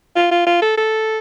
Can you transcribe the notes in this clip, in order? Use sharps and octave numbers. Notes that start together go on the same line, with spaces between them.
F4
F4
F4
A4
A4